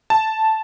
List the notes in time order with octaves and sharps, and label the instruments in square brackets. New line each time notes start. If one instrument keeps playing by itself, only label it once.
[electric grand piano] A5